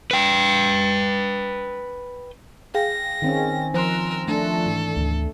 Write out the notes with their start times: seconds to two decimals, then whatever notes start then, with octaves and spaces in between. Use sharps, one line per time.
0.11 B4 G5
2.75 G#4 F5 G5 A#6
3.22 D#3 C4 C#4
3.74 F3 A#4 C6 E6 F#6 A#6
4.28 A3 D4 A4
4.66 G#2 E3
4.97 D2